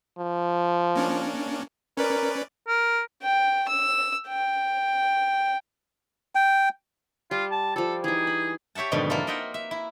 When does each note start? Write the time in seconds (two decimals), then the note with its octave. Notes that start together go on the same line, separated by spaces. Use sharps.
0.18 F3
0.96 A#3 C#4 D4
1.97 C#4 A#4 B4 D5
2.68 A#4
3.23 G5
3.69 E6
4.28 G5
6.35 G5
7.31 G3 F4
7.51 A5
7.76 F3 G3 A4
8.04 E3 D#4 G#4
8.27 B5
8.75 G4 C#5 E5 F#5 A5
8.92 F2 G#2 B2 D3 D#3 G3
9.10 A#3 D4 E4 F4 A4
9.27 A#4 D#5 E5 F#5 G5 C6
9.54 E5
9.71 E4